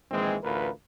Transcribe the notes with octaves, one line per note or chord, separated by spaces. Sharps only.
A#1 D#3 E3 G#3 C4 G#4
A1 D2 F4 A#4 B4